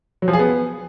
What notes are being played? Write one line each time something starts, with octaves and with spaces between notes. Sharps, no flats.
F#3
F3
G#4
B3